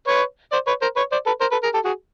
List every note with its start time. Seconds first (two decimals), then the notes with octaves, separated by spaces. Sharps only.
0.08 B4 C#5
0.52 C5 D5
0.67 B4 C#5
0.81 A#4 C5
0.96 B4 C#5
1.12 C5 D5
1.26 A4 B4
1.40 A#4 C5
1.51 A4 B4
1.63 G#4 A#4
1.74 G4 A4
1.84 F#4 G#4